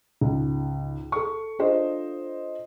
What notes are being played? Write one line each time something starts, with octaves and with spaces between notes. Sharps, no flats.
C#2 G#2
A4 C#6
D4 F4 A4 C5 D#5